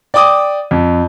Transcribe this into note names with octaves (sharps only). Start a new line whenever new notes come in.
D5 G5 D6 D#6
F2